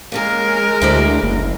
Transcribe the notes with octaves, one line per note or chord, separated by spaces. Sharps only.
G#3 A#3 C#4 G#4 A#4
D2 E4 C5 D5
F#1